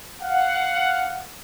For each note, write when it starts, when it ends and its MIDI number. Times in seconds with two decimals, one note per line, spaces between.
0.22 1.27 77
0.22 1.27 78